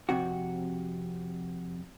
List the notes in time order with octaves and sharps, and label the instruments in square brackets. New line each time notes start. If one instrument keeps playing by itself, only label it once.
[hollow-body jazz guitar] F2 C3 F#4